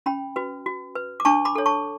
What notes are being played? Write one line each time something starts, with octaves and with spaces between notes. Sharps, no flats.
C#4 G5 B5
F#4 B4
F#4
B4
D6
D4 A5 C#6
B5 D6
A4 C#5
A5 C#6